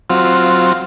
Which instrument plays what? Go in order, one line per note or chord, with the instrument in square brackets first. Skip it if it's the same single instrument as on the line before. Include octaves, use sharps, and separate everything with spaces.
[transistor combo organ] F#3 C4 F4